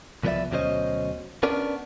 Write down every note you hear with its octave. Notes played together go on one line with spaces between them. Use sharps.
C2 F3 B3 B4 D5 E5
D2 B2 F#3 C#4 C5 D#5
B3 C#4 D4 A#4 D5